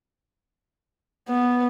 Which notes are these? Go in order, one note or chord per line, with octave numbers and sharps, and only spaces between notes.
B3